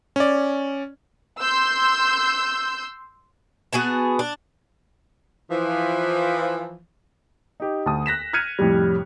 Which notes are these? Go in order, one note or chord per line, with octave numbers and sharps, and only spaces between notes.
C#4 D5
C6 E6 G6
B3 F#4 G#4 A5
D4
E3 F3
D#4 G4
D2 A5 D#6
F#6 A#6 B6 E7
F6 F#6 G#6 C#7 D#7
F2 A2 C3 G3